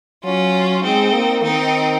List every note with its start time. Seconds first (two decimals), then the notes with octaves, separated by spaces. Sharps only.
0.24 F#3 C#4 F4
0.83 G#3 C4 D#4
1.14 A#3
1.43 D#3 C4 D#4